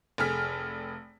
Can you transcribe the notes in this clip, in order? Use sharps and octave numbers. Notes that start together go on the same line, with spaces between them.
F1 G#4 A4 F6 B6